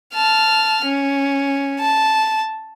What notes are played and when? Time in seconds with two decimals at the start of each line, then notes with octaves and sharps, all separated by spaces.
0.15 A5 F6
0.85 C#4
1.80 A5